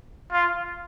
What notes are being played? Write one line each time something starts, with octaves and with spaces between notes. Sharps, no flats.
F4